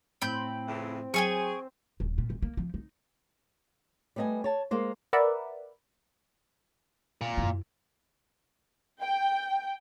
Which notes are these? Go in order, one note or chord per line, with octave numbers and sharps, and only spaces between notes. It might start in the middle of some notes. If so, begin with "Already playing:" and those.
A2 C4 E4 G5 B5 G6
F2 C#3 E3
F#3 G#4 G5 G#5 C#6
D#1
A#2
D#1
A#3
F3
D#4
G3 A3 B3 D#5 G#5
C#5 A5
G#3 A#3 C5
A#4 B4 D5 E5 F#5
A#2
F#2 E4
G5